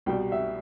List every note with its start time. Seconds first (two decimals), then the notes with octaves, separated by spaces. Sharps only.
0.06 C2 B2 G3 G5
0.32 E5